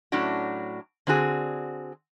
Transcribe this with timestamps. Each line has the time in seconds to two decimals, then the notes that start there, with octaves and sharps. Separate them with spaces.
0.12 A2 F#3 C#4 D4 F#4
1.07 D3 C4 F#4 G#4